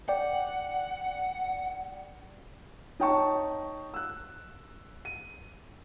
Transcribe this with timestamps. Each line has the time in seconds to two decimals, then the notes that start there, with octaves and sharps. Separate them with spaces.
0.09 D5 F#5 G5
3.00 D#4 C#5 G5 A5 C#6
3.94 E6 F#6
5.05 D#7